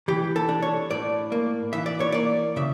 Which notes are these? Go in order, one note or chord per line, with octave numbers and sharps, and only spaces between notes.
E3 G4
A4
D4
C#5
A2 D5
A#3
E3 E5
D5
C#5
A#3 D5
C#3 E5